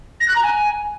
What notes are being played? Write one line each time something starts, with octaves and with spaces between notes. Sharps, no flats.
A#6
F#6
A#5
G#5